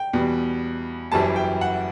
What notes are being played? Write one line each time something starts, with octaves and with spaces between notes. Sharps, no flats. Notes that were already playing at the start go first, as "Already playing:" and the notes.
Already playing: G5
E2 B2 G3
F#1 F#2 E3 G3 A5
G5
F#5